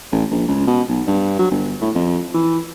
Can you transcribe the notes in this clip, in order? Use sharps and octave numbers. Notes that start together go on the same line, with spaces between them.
A1
A#1
C#2
B2
B1
G2
F#3
G1
A2
F2
E3